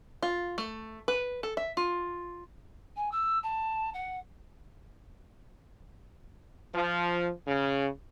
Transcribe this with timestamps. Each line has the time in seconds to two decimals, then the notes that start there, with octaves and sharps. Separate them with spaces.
0.23 F4
0.58 A3
1.08 B4
1.43 A4
1.57 E5
1.77 F4
2.96 G#5
3.11 E6
3.43 A5
3.93 F#5
6.75 F3
7.47 C#3